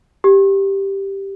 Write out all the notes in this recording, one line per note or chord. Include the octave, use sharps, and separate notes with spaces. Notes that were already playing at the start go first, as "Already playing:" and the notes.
G4